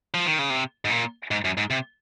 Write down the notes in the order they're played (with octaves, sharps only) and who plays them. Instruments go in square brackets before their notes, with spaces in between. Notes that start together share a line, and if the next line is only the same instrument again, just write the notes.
[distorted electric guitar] F3
D#3
C#3
C3
G#2
A#2
G#2
F#2
G#2
C3